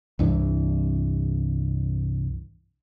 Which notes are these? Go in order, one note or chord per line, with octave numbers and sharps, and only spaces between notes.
C2 G2 E3